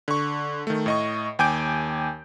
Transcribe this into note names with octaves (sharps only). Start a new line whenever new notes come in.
D3 C#6
D#3 A3
A2 D#5 C#6
D#2 G5 G#5 D6 G6 D7